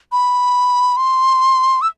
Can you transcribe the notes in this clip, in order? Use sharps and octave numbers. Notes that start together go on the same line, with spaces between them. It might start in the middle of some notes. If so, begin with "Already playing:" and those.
B5
C6
E6